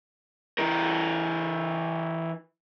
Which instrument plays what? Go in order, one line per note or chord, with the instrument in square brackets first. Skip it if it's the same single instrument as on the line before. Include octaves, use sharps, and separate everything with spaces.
[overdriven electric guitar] E3 A#4